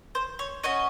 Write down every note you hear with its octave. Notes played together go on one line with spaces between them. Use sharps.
C5
C#5
C#4 F#4 D#5